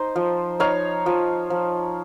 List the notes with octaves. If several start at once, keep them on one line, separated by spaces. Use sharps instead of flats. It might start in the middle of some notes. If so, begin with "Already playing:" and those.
Already playing: D#4 C5
F3
D#4 C#5 F5
F3
F3